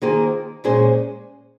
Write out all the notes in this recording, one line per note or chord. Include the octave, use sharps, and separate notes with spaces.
D#3 A#3 F4 G#4 C5
A#2 G#3 C#4 G#4 C5